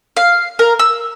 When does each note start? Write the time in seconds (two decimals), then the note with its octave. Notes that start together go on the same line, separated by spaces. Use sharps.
0.17 F5
0.59 A#4
0.79 E6